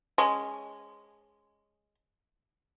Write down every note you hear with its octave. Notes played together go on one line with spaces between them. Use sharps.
G#3 C#4